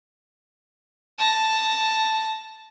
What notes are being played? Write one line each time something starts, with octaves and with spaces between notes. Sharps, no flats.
A5 A#6